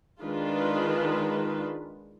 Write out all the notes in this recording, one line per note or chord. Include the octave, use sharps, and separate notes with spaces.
D#3 G#3 D4 F4 B4